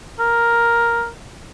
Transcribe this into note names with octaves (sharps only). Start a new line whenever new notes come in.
A#4